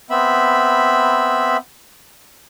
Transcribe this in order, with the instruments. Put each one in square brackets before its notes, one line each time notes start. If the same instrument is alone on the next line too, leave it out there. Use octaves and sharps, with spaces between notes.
[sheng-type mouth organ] B3 C4 E5 B5